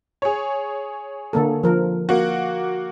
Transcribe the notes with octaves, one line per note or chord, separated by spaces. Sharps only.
G#4 C#5
D3 A#3 A4
F3 A#4
A#3 F#4